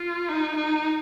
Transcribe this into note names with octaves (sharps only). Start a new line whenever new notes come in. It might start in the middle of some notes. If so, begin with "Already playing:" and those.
Already playing: F4
D#4
D#4